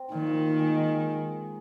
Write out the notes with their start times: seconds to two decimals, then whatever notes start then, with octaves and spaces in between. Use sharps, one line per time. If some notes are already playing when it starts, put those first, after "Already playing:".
Already playing: C4
0.12 A#2 D#3
0.59 G#3